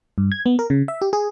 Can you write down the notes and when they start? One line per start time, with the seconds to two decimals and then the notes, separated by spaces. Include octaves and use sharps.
0.18 G2
0.32 G#6
0.46 B3
0.59 A#4
0.70 C#3
0.88 E5
1.02 G4
1.13 G#4